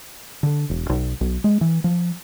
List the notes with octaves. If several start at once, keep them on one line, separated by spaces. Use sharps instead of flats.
D3
E1
B1
B1
G#3
E3
F3